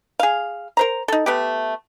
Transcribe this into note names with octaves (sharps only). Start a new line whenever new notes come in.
G#4 F5
A#4 C5 A#5
D#4 A4
A3 B3 G4